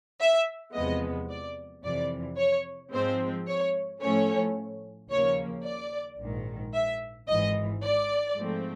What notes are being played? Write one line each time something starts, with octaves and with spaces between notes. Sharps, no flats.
E5
E2 C3 F3 G#3 B3 D#5
D5
F2 C3 E3 D5
C#5
G#2 F3 G#3 C4 C5
C#5
A2 F3 A3 C#4 C#5
D#2 C#3 F3 A#3 C#5
D5
A#1 G#2 D#3
E5
G#1 G#2 E3 D#5
D5
G#2 F3 A3 C4